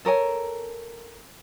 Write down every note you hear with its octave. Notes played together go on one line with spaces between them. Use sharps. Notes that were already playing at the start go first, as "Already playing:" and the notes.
A4 A#4 C#5 G#5